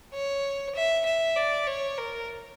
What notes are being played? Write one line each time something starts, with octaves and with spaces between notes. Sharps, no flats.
C#5
E5
E5
D5
C#5
A#4